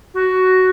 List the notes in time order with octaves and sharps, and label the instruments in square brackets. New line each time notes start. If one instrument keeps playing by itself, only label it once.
[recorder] F#4